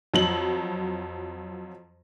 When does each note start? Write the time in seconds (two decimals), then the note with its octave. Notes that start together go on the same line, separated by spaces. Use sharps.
0.14 F2 F#3 F#7